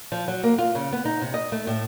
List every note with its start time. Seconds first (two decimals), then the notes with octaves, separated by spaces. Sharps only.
0.12 F3
0.28 F#3
0.43 A#3
0.58 F4
0.75 C#3
0.92 B3
1.05 D#4
1.21 C3
1.34 D#5
1.52 A3
1.67 A2